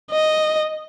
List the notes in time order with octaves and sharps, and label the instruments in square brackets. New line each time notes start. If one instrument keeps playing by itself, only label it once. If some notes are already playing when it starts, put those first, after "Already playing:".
[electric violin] D#5